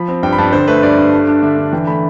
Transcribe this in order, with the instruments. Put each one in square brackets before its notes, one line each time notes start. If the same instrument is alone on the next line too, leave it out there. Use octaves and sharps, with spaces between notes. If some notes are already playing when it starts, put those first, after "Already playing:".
Already playing: [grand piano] F3 B5
C4
G2 G5
B5
G2 A5
D3 C5
A3 B4
G2 D5
G2
A3
D4
D3 E5
D3
E3 G5
A3 B5